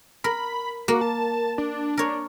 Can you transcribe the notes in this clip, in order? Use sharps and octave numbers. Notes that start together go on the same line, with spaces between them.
A#4 B5
A#3 F#4
A5
D4
A#4 C#5